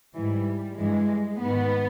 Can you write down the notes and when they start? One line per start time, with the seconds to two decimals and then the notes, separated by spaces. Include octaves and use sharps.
0.16 G#2 E3 G3
0.79 G2 E3 G#3
1.42 G#2 D#3 B3